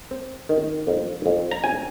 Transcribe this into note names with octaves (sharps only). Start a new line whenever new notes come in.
C4
D#3
F2
F2
A#5
C4 G#5